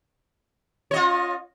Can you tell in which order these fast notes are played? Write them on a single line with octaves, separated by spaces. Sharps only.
C#5 D#5 F4